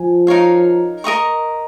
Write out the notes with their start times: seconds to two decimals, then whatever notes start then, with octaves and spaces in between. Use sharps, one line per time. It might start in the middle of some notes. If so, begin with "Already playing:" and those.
Already playing: F3 G#5
0.27 D#4 A#4 C#5 F5
1.04 A#4 D#5 A#5 C#6